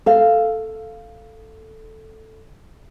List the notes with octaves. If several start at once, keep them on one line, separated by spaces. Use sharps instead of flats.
A4 F5